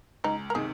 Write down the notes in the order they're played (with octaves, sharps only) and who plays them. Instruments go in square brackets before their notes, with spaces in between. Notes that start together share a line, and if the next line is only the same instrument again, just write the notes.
[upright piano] C#2 [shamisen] D#4
[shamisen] A#4
[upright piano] C3 D#3 [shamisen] G#4